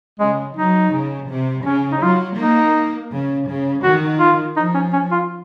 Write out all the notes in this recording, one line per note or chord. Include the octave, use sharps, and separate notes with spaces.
C#3 G#3
F#3 D#4
C#3
C3
C#3 C#4
D#4
F#3 F4
A#3 D#4
C#3
C#3
D#3 F#4
F4
F3 D#4
C#4
C#4
F4